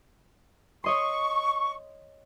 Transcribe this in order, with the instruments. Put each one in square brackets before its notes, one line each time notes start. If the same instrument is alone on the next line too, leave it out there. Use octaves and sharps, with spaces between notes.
[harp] C#5 D#5 C6 [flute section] C#6